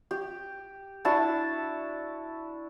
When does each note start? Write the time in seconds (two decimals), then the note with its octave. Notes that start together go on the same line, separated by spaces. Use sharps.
0.11 G4
1.05 D4 E4 F#4 A5